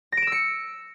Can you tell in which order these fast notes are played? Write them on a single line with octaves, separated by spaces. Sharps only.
A#6 D7 E7 E6 C#7